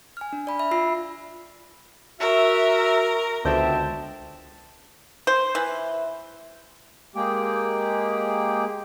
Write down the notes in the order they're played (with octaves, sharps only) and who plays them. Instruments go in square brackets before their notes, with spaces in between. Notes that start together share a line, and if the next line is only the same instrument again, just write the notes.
[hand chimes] G#5 F6
D4
D5 B5
E5 B5
F4 E6 C7
[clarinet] F#4 [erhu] A#4 [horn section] E5
[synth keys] C#2 D3 G5 [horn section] B2 C5 E5 [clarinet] A5
[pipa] C5
E3
[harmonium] G#3 A#3 G4 G#4 G5